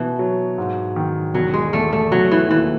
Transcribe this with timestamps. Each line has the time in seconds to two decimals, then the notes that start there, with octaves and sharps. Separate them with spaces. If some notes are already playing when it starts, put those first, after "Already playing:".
Already playing: B2 E3
0.19 F#3
0.58 G#2
0.96 D#3
1.34 E1 F#3
1.54 G#3
1.73 E2 A3
1.93 A3
2.12 E1 F#3
2.31 E3
2.51 D#2 E3